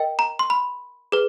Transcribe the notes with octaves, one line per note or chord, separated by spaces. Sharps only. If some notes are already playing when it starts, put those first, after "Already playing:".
Already playing: A#4 D#5 G5
A#5
C6
B5
G#4 B4